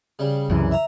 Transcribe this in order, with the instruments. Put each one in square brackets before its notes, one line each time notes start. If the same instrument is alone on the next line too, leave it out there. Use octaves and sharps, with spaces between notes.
[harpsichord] C#3 G3
[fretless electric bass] C2 F#2 E3
[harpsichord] E5 A#5